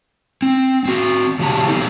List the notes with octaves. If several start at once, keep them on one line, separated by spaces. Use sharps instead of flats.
C4
C4 F#4
C#3 F3 F#4 G4 A5 A#5
B3 D#4 G4 A4